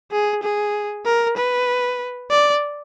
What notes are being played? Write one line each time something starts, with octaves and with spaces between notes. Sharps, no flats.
G#4
G#4
A#4
B4
D5